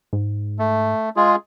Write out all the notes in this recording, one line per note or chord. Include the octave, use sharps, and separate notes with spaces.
G#2
A3
G#3 F4 G#4